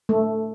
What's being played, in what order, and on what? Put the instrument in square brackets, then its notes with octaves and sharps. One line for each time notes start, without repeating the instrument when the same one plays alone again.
[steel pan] A3